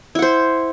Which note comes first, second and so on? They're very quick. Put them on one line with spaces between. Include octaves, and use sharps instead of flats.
E4 F#5 C5